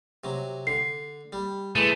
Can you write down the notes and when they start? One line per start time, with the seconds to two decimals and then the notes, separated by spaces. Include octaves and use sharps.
0.24 C3 F#3
0.67 D3 C7
1.33 G3
1.76 E3 G#3 A3 D#7